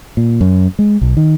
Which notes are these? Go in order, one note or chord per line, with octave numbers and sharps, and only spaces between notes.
A#2
F#2
G#3
B1
D#3